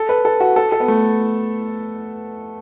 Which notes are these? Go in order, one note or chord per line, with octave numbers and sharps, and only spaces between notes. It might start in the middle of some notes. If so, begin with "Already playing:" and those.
Already playing: A4
B4
A4
F#4
A4
A4
B3
A3